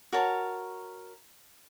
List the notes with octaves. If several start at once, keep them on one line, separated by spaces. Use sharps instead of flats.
F#4 A#4 C#5 A5